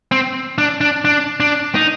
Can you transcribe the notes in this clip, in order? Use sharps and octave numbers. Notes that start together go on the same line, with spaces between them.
C4
D4
D4
D4
D4
D#4